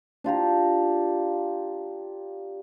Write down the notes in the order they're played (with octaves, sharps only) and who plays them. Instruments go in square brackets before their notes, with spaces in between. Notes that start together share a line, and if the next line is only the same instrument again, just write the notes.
[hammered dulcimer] D4 F4 G4 A#5